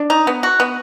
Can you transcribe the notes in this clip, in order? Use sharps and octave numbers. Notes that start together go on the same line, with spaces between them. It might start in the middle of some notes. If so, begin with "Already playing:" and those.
Already playing: D4
D#4
B3
F#4
B3